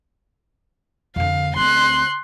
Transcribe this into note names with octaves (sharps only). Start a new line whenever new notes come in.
F2 D3 F5
D2 C4 C6 F#6